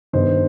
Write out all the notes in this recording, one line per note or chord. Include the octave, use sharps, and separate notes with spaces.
G1 G2 D#3 C5 D#5